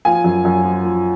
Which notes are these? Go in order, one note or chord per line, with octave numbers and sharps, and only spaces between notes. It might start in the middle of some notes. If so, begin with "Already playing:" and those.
F3 F5 G#5
F#2
F#2
F3
F3